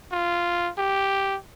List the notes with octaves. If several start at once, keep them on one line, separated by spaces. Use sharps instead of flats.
F4
G4